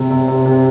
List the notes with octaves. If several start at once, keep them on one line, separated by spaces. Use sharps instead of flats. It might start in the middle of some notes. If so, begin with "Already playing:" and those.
Already playing: C3
C3
C3
C3